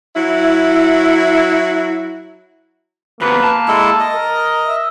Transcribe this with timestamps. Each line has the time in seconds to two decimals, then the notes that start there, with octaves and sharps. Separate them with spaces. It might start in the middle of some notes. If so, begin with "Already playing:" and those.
0.15 F#3 E4
3.21 D2 A#3 B3 B4
3.44 A5
3.68 G#3 E4 A4
4.00 D#5
4.15 A#4
4.67 E5